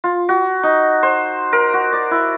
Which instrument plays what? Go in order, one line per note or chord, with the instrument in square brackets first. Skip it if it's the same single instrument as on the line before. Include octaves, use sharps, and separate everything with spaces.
[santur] F4
F#4
D#4
C5
A#4
F#4
D5
E4